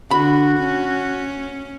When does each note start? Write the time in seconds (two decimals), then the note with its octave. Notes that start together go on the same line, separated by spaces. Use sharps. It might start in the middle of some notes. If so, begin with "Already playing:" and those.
0.11 D3 F#4 B5
0.59 C#4